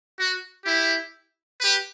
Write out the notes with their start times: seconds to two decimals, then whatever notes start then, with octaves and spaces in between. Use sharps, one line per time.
0.17 F#4
0.64 E4 G4
1.59 G4 B4